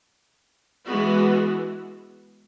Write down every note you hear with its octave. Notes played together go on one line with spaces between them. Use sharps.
E3 G#3 B3 F#4